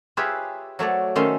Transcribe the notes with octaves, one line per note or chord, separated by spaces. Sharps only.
F4 G4 G#4 B4 C#5 E5
F#3 A3 C#5 D5
D#3 A3 C#4 E5 C6